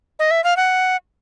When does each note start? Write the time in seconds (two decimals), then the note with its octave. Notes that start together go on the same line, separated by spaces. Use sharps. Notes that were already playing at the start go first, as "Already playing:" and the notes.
0.19 D#5
0.31 E5
0.44 F5
0.57 F#5